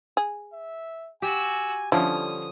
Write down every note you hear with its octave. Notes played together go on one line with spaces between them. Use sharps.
G#4
E5
F#4 G4 G#5 E6
D3 F3 G3 C#4 E4 D#6